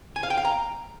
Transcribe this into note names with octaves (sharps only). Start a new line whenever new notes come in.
G#5
F5
G5
F5
A#5